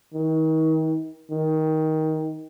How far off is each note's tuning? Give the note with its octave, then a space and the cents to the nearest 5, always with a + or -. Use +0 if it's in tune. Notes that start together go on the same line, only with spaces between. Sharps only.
D#3 +35
D#3 +15